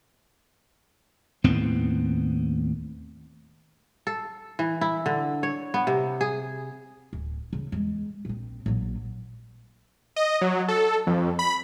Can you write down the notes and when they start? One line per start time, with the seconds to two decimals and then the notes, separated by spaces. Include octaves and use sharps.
1.44 D#2 A2 B3 C4
4.07 A4
4.59 E3
4.81 E4
5.06 D3
5.43 C#5
5.74 B3
5.87 C3
6.21 G#4
7.13 D1
7.53 C#3
7.72 E2 G#3
8.25 A#1 C4
8.66 A#1 F#3
10.16 D#5
10.41 F#3
10.68 A4
11.07 F2
11.39 B5